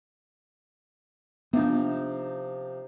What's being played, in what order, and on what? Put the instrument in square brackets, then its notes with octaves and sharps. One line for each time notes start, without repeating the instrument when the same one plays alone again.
[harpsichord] C3 F3 D#4 [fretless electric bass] B3 D4